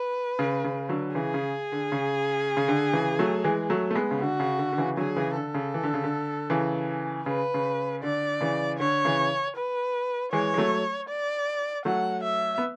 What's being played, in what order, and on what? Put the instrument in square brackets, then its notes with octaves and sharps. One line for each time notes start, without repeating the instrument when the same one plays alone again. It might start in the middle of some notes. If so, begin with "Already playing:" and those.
Already playing: [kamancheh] B4
[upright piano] C#3
C#3
D3 F#3
[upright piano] C#3 E3 [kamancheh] G#4
[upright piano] C#3
D3
C#3
C#3
D3
C#3 E3
F#3 A3
E3 G#3
F#3 A3
A3
G#3 B3
C#3
[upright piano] D3 [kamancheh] F#4
[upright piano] C#3
D3
D3
C#3 E3
[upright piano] D3 F#3 [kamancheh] G#4
[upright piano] C#3 E3
[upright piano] D3 [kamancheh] A4
[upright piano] C#3
E3
D3
C#3
D3
C#3 E3
[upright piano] C#3 [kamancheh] B4
[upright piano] C#3
[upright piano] D3 [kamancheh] D5
[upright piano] C#3 E3
[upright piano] D3 [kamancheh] C#5
[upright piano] C#3 E3
[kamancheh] B4
[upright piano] E3 G#3 [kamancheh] C#5
[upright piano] G#3
F#3 A3
[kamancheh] D5
[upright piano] F#3 A3 [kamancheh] F#5
[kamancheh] E5
[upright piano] B3